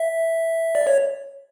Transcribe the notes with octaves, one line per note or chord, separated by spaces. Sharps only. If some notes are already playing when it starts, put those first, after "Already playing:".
Already playing: E5
D5
C#5